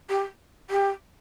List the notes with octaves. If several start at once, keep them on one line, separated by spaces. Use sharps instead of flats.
G4
G4